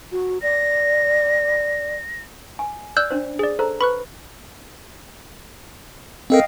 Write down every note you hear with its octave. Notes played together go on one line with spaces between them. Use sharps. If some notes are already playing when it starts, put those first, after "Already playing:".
F#4
D5 A#6
G#5
D5 E6 F#6 G6
C#4 D4 C5
G#4 D5
A4 C5 A#5
B4 B5 C#6 F#6
C4 A4 A#4 D#5 F5 G5